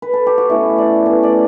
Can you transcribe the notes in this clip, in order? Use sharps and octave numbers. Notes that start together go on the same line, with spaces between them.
B4
A4
G4
F#4
B2 A3 C#4 E4
D5
B2 A3 C#4
D5